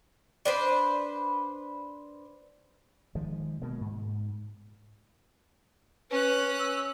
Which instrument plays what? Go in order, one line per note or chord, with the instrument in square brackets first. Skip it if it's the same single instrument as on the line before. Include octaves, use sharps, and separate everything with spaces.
[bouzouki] D4 B4 C5
[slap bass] D#3 F3 G#3
B2 G#3 A#3
G#2
[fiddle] C#4 F#6 [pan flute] B4
[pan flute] E6